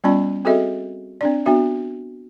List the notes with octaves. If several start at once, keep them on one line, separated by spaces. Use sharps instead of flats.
G3 B3 C#4 F4 D5 B5
C4 F#4 G#4 A4 D#5 E5
C4 D4 D5
B3 D4 F#4 E5